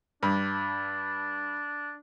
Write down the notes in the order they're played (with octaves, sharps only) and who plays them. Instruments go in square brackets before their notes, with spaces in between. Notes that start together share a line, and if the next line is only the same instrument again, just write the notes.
[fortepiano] G2 [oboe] D4